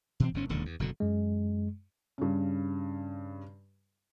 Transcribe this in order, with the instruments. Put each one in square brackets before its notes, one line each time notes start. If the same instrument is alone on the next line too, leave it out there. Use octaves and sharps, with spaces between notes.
[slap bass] B2 E3 C4
G1 G#2 C#4
E1 D#2 D3
E2
F#1 B2 D3
[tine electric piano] F#2 G#3
[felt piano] G2 C#3